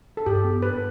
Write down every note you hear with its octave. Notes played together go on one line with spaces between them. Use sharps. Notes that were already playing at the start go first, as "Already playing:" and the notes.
A4
G2 G4
B3
D4 B4